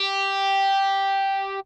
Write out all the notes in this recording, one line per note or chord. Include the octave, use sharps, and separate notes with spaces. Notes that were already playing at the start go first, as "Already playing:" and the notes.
Already playing: G4